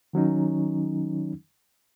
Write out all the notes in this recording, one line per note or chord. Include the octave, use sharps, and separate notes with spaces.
D#3 F#3 C#4 D#4